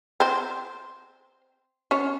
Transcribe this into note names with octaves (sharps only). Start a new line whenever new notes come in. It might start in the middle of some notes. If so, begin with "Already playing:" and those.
C4 C5
C#4 C#5